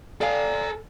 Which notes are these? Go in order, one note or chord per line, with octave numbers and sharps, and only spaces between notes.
A4 D5 F5 G#5